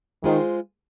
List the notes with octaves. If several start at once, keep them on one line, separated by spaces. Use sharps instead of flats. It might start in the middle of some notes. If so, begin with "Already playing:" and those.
D#3 G#3 F4 G#4 C5